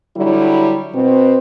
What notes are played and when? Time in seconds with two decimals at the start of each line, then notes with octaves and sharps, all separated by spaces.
0.16 D3 F#3 G3 E4
0.94 B2 C4